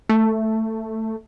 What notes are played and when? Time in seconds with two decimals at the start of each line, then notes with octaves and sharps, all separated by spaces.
0.09 A3